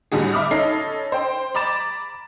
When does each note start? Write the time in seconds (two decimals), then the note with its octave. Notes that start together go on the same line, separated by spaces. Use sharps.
0.12 A2 D3 G3 F#4 G#4
0.33 E5 B5 D6 D#6 F6
0.51 C#4 D#4 A4 B5 C7
1.12 C5 G5
1.55 A#5 B5 D6 A6 E7